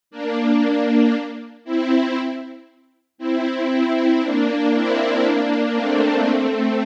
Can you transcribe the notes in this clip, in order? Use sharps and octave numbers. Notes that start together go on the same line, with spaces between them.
A#3 D4
C4 E4
C4 E4
C4 E4
A#3 D4
C4 E4
A#3 D4
A3 C4
A3 C4